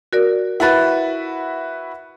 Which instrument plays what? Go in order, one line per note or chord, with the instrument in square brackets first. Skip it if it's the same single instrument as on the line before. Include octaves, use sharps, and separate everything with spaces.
[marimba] F#4 A#4 D5
[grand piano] E4 F#4 B4 [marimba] F#5 A6